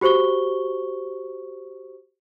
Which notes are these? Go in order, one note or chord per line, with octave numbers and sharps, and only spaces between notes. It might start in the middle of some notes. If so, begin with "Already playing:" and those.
F#4 G4 C5 C#6 G7